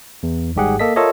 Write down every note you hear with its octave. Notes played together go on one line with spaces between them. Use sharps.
E2
G#1 G#2 G3 G4 G#4 F#5
A#3 A4 D#5 B6
F4 A4 A#4 C#5 D#5 E5